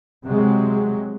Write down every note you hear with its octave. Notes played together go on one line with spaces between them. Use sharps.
C3 F#3 G#3